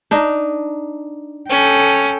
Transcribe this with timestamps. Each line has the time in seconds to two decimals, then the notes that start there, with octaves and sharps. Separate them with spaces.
0.11 D4 D#4
1.49 C#4 A4 G5